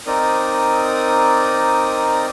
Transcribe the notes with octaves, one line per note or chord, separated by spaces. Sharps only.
C4 D#4 A#4 D5 D#6